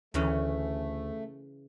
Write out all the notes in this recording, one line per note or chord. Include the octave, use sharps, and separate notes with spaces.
D2 C#3 E3 A3 C#4